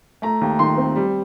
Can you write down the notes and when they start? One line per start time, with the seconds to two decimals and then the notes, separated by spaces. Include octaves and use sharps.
0.22 A3 A#5
0.41 D#2
0.59 D#3 C6
0.77 C4
0.96 G3